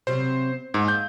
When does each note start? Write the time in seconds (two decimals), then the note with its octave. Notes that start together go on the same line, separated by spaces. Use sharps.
0.07 C3 F#3 G3 C5
0.74 G#2 A#3
0.88 G6